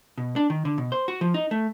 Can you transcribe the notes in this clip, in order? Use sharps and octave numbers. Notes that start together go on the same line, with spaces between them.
B2
D4
D#3
D3
B2
C5
F#4
F3
D#4
A3